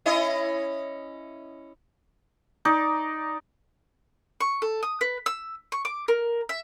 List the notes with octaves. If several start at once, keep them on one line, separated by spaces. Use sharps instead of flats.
C#4 E4 D#5
D#4 D5
C#6
A4
D#6
B4
E6
C#6
D6
A#4
E5